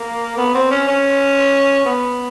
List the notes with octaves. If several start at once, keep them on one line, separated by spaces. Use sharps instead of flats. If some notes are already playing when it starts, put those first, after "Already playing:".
Already playing: A#3
B3
C4
C#4
C#4
B3